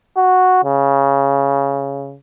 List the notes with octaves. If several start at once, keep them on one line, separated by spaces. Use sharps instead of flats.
F#4
C#3